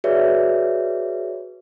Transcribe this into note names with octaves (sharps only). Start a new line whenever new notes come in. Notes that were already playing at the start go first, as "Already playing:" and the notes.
F#4 G#4 B4 C#5 D5 E5